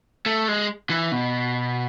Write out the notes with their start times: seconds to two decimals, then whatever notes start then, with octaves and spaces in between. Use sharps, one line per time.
0.26 A3
0.48 G#3
0.90 E3
1.12 B2